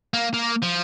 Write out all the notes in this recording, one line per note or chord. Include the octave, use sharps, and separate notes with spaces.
A#3
A#3
F3